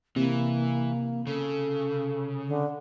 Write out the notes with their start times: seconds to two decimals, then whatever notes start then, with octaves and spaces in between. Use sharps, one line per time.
0.16 C3 E3 A#3
1.27 C#3 A4
2.48 D3